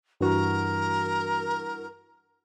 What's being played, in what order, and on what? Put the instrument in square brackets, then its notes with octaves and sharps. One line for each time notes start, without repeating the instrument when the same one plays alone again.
[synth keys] G2 E3 F#4 [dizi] A#4